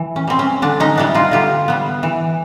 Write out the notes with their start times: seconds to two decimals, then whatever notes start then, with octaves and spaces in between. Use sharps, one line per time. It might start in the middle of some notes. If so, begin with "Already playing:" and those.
Already playing: E3
0.16 C#4
0.28 G3 C4
0.39 C#4
0.62 D3 D4
0.80 C#4 D#4
0.96 G3 B3 D4 E4
1.14 D#4 F4
1.31 D3 F4 G4
1.68 G3 B3
2.03 E3